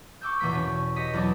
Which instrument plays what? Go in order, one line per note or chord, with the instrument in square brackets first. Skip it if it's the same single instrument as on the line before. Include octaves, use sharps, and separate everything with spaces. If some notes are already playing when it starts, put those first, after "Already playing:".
[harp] C#6 D6 E6 G6
E2 B2 E3 A#3 B6 D7
B2 C#4
G4 D#5 B6 C#7
E2 F#3 D4